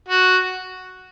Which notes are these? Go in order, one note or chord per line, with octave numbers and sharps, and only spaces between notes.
F#4